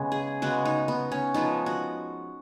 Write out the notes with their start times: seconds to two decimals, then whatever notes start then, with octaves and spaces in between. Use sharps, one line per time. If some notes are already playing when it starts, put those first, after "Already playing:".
Already playing: C#3 G#3 B3
0.12 G#4
0.42 C#3 G#3 B3 F#4
0.65 D#4
0.88 B3
1.12 C#4
1.34 F3 G#3 B3 D#4
1.66 F#4